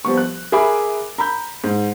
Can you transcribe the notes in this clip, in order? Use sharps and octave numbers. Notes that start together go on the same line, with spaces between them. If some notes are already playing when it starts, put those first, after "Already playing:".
F3 G3 B3 C#6
F#6
G#4 A#4 E5 G#5 B5 D6
A#5 B5 G6
G#2